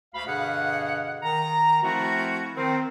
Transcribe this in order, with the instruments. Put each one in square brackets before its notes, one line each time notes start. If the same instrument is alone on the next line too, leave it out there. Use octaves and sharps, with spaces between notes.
[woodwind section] D2 F5 B5
G2 B2 D3 G#4 F5 F#5
D#3 A#5
F3 A3 C4 E4 F#4
D#3 C4